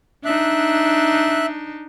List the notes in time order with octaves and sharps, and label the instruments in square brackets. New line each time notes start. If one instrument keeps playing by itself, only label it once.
[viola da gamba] D4 D#4 [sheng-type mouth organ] E5 F#6